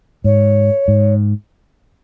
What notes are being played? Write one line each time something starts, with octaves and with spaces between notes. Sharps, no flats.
G#2 C#5
G#2